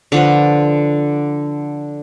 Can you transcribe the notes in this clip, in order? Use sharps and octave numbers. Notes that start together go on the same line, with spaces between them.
D3 F3 B4